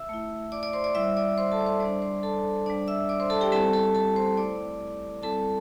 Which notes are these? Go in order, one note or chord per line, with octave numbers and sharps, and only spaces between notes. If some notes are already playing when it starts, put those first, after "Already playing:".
Already playing: E5 E6
A3 E4
D5 D6
D5 D6
C5 C6
D5 D6
G3 E4 E5 E6
D5 D6
C5 C6
A4 A5
D6
C5 C6
G3 D4 D5 D6
C5 C6
A4 A5
G3 D4 D5 D6
E5 E6
D5 D6
C5 C6
A4 A5
G4 G5
G3 C4 E4 A4 A5
A4 A5
A4 A5
C5 C6
A3 E4 D5 D6
G3 C4 E4 A4 A5